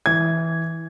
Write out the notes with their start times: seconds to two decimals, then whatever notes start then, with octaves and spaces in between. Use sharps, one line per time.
0.06 E3 G#6